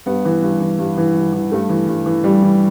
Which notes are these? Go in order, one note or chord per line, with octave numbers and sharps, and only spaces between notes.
G2 B3
E3
G2
E3
G2
E3
G2
E3
G2 A3
E3
G2
E3
G2 G3
E3